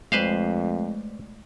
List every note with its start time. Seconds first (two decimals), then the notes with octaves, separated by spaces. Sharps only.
0.12 F2 G#3 A3 B4 C5 F5